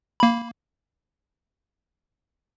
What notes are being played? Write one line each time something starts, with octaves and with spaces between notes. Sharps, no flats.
A#3 B5